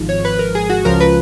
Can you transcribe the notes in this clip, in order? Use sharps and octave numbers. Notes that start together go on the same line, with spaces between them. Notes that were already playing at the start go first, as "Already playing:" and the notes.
Already playing: G#1 G#2 F3
C#5
B4
A#4
G#4
F#4
C#2 C#3 F3 A#4
B4